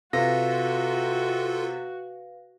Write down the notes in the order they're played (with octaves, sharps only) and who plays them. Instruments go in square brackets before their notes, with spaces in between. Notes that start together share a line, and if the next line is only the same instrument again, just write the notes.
[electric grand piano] C3 A#6 [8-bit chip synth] F4 A4 [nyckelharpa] F#4 [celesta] B4 F5